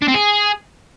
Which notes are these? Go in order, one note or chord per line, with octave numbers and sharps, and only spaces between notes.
D4
C4
G#4